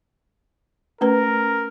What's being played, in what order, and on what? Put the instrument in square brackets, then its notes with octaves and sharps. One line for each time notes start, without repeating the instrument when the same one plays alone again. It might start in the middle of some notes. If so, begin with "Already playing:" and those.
[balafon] A3 C#4 B4 [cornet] A#4